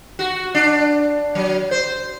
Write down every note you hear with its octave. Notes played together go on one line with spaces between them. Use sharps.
F#4
D4
F#3
C5